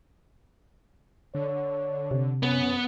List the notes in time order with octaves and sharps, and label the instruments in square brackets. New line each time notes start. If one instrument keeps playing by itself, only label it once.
[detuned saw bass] D3 [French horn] C#5
[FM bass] C3
[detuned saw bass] F#2 [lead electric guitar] B3 [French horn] C#4